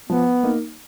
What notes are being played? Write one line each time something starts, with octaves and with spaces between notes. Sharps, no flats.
F3 B3
A#3 D#4